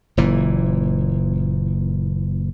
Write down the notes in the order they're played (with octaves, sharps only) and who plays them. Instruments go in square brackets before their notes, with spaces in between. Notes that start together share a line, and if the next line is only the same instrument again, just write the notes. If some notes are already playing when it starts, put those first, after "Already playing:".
[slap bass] F#1 A#2 E3